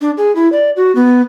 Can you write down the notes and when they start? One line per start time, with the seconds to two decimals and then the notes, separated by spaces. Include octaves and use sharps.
0.01 D4
0.17 G#4
0.35 E4
0.52 D5
0.76 F#4
0.95 B3